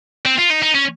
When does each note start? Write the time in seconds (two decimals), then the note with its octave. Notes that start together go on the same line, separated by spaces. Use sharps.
0.25 C4
0.38 F4
0.50 D#4
0.62 D#4
0.75 C#4